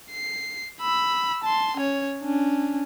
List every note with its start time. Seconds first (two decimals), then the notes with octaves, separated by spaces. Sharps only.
0.12 C7
0.81 B5 E6
1.44 A5 C6
1.77 C#4 C#5
2.23 C#4 D4